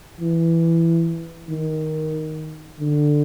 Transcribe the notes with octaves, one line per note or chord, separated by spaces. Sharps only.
E3
D#3
D3